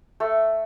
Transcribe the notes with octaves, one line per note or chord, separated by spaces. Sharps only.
A3